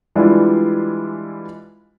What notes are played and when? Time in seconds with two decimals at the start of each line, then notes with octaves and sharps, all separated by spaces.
0.15 E3 G3 G#3 D4 E4 F4